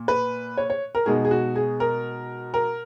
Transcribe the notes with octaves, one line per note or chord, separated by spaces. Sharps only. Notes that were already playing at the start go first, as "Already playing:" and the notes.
Already playing: A#2
B4
C#5
C#5
A#4
B2 G#3 D#4 G#4
G#4
F#4
G#4
A#4
A#4